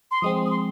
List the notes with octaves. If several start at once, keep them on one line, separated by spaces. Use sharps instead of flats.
C6
F3 G#3 C4 D#6
D#6
C6